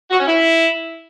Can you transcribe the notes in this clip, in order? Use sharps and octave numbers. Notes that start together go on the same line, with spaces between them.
F#4
C#4
E4